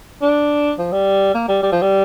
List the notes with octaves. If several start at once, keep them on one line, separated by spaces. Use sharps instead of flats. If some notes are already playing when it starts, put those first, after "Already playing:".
D4
F3
G3
A#3
G3
G3
F3
G3